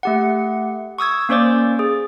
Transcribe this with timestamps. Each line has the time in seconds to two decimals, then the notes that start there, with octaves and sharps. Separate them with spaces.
0.03 A3 G4 F#5
0.99 C#6 D#6 E6 G#6
1.29 A#3 C#4 C5 D5 D6
1.79 G#4